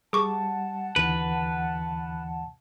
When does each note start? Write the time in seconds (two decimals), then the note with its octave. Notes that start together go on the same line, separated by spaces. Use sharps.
0.13 G3 G#4 F#5 A5 C#6 D6
0.96 D#2 D3 E3 B4